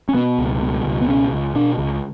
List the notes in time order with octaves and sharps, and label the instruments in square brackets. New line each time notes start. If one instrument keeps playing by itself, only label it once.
[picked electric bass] C#4
B2 B3
C#2
B2
C#2
B3
B2 C#4
C#2
B2 D4
C#2